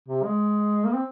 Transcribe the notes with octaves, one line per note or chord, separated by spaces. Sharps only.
C3
G#3
A#3
C4